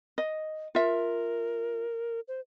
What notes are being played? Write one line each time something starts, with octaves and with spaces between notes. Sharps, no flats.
D#5
F4 A#4 E5
C5